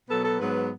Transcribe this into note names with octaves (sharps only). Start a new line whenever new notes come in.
B2 F#3 B3 A4
A4
G#2 F#3 B3 B4